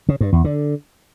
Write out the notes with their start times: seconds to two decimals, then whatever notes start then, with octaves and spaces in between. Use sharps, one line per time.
0.09 C#3
0.21 G2
0.33 E2
0.44 D3